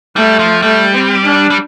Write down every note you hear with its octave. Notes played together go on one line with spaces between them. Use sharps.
G3 A3
F3
G3 A3
C4
D4
G3